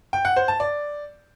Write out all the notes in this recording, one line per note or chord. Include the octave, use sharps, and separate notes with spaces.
G5
F#5
C5
A5
D5